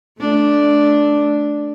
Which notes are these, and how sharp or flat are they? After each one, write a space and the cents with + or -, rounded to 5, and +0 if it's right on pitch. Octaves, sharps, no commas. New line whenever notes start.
A3 -15 D4 +0